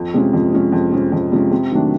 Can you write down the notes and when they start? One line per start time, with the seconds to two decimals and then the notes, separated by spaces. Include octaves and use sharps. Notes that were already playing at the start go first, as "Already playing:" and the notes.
Already playing: F2
0.14 C3 F3 G#3 C#4
0.33 F2
0.53 C3 F3 G#3 C#4
0.72 F2
0.92 C3 F3 G#3 C#4
1.12 F2
1.32 C3 F3 G#3 C#4
1.51 C3
1.72 D#3 F#3 A3 D4